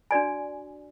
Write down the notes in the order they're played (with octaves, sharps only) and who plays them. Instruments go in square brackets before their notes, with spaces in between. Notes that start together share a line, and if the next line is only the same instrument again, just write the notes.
[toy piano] D4 F#4 D5 G#5